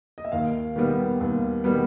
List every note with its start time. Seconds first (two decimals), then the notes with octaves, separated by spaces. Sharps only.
0.18 D#5
0.25 E5
0.32 D#2 F5
0.76 D#3 G3 B3
1.20 D#2
1.64 D#3 G3 B3